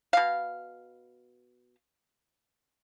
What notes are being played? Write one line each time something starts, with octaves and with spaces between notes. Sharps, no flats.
B2 F5